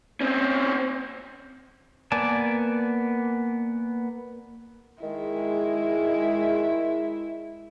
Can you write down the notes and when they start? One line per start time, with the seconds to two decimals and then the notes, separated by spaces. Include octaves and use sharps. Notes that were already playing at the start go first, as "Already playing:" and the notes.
0.21 C4 C#4
2.12 A#3 B3 D5 G#5 A5
5.03 D#3 G#3 E4